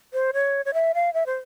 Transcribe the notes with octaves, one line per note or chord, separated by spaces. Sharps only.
C5
C#5
C#5
E5
F5
E5
C5